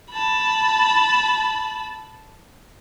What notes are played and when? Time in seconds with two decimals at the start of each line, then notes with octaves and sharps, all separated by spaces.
0.12 A5 B5